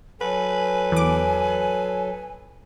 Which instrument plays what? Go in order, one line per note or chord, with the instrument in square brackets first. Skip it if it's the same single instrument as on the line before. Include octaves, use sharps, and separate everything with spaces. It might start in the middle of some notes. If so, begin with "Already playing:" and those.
[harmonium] F#3 A4 [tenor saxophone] B4 [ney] G#5
[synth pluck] E2 D6